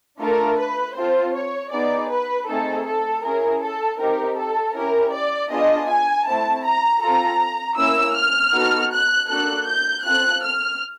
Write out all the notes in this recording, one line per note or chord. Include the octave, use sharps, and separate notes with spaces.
A3 D4 F4 A4 A#4
B4
C4 F4 A4 C5
C#5
B3 D#4 G#4 D5
B4
A3 C4 D#4 G#4 A4
A4
C#4 E4 G#4 A#4
A4
C4 D#4 G4 A#4
A4
C#4 E4 G4 A#4
D5
B3 D4 F4 G#4 D#5
G#5
A3 C4 E4 A5
A#5
C4 F4 A4 A#5
A#3 C#4 E4 E6
F6
B3 D#4 F#4 A4
F#6
A#3 D4 F#4 A4 F#6
G6
C4 F4 A4 F#6
F6